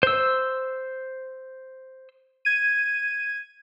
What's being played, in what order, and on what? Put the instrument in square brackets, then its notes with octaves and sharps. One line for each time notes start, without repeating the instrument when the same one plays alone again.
[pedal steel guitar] C5 E6
[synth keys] G#6 D#7